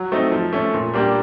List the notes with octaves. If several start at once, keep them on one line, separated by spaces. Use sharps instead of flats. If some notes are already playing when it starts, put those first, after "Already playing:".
Already playing: F#3
A3 C4 D#4
F3
A3 C#4
A#2
G3 A#3 D4 G4